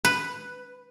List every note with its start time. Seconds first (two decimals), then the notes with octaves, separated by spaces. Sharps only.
0.05 B4